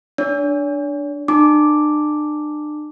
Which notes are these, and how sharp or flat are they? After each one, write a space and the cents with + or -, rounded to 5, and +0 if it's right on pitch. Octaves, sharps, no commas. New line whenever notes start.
D4 +0 C#5 +45
D4 +40 A5 +25 D6 +0